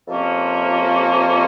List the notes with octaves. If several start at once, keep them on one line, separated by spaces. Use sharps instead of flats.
F2 C3 F3 A#3 C#4